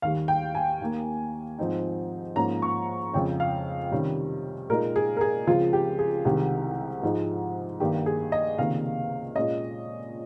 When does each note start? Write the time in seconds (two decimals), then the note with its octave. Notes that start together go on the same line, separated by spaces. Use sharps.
0.02 D#2 D#3 G3 F5
0.28 G5
0.55 G#5
0.81 D#2 D#3 A#3
1.59 G#2 F3 C4 D#4
2.36 G#2 F3 A#3 C#4 A#5
2.62 C#6
3.13 F2 C#3 G#3 C#4 G5
3.40 F5
3.92 C3 D#3 G3 C#4
4.70 A#2 G#3 D#4 A#4
4.96 G#4
5.17 A#4
5.21 G#4
5.47 C#2 C#3 F3 G#3 C4 F4
5.73 G4
5.99 G#4
6.25 C2 C3 D#3 G#3 G4
7.03 G#2 F3 G#3 D#4
7.80 G2 D#3 A#3 G4
8.06 G#4
8.32 D#5
8.58 C#2 C3 D#3 A#3 F5
9.36 A#2 G#3 C#4 D#5